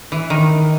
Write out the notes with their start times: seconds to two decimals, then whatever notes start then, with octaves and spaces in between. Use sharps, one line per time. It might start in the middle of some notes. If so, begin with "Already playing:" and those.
0.12 E3
0.30 D#3